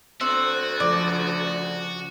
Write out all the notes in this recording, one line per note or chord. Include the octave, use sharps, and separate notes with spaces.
D2 C4 F#4
C#3 F3 A3 D5